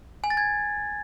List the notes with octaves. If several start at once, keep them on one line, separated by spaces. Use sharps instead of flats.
G#5
A6
G#6